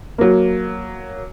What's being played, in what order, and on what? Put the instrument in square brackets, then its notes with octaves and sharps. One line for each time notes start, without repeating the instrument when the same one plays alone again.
[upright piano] F#3 A#3